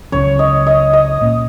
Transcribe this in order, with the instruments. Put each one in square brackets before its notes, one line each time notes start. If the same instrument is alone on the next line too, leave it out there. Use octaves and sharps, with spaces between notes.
[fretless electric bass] C#2 C#3 F#3 C#4 [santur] C#5
[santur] D#5
D#5
D#5
[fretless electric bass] A#2 A#3 C#4